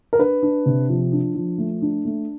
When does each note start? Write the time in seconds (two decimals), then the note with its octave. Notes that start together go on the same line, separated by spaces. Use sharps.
0.13 A#4
0.19 D4 B4
0.42 D4
0.66 C3
0.89 F3
1.12 D4
1.35 F3
1.58 A3
1.82 D4
2.05 A3